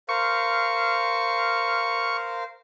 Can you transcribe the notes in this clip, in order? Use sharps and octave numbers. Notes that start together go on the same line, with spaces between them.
A#4 C5 F5 C#6